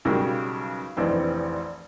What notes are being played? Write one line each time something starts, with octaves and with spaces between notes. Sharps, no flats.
B1 C#3 F#3 G3 A#4
F1 A#1 E3 C4 D#4